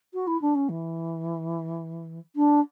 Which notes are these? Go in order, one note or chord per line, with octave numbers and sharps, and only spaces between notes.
F#4
E4
D4
C#4
E3
D4